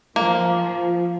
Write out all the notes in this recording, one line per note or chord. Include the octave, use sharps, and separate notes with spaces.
F3 A#3